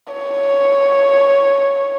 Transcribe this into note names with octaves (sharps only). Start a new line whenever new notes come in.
C#5